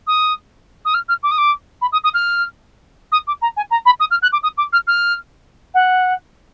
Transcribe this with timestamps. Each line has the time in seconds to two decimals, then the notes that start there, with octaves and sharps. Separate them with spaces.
0.07 D#6
0.85 D#6
0.94 F6
1.09 F6
1.23 D6
1.31 D#6
1.38 D6
1.82 B5
1.92 D#6
2.04 D#6
2.14 F6
3.12 D#6
3.27 D6
3.42 A#5
3.57 G#5
3.71 A#5
3.86 B5
4.00 D#6
4.11 F6
4.22 F#6
4.33 D6
4.43 D#6
4.58 D6
4.73 F6
4.87 F6
5.74 F#5